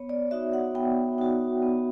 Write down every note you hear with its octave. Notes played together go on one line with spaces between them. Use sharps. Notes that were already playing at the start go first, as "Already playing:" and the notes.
Already playing: B3 C#5
D5
D#4 F#4 E5
F#5
B3 G5
D#4 F#4
B3